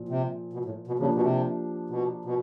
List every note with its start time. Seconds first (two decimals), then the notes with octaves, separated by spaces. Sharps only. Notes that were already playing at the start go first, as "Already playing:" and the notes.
Already playing: A#2 F3
0.09 C3
0.53 B2
0.65 A2
0.87 B2
0.99 C#3 F3 A#3 D4 G4
1.15 B2
1.22 C3
1.90 B2
2.25 B2